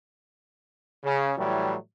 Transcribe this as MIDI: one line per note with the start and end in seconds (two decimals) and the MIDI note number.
1.04 1.32 49
1.37 1.76 45
1.37 1.76 52
1.37 1.76 54
1.37 1.76 55